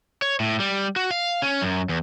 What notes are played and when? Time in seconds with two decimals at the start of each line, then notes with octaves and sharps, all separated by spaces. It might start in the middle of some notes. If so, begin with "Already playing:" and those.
0.22 C#5
0.40 A2
0.60 G3
0.96 F#4
1.11 F5
1.42 C#4
1.62 F#2
1.89 E2